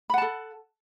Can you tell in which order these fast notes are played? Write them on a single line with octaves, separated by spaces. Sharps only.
B5 F#5 A5 A4